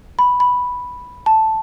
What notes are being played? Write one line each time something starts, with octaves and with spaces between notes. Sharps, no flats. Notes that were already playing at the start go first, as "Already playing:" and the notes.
B5
B5
A5